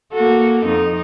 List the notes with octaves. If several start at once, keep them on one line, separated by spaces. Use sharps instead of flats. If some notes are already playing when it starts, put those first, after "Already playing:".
A#3 F#4 A4
F2 D#4